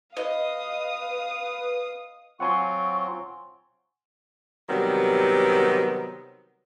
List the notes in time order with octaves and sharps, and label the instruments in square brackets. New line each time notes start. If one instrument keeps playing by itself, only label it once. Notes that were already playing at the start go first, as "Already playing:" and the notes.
[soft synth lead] B4 [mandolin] D#5 [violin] F5 D#6
[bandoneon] F#3 C4 F4 [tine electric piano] F#5 G#5 C6 [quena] C#6
[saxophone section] C3 D#3 F#3 G3 B3 C4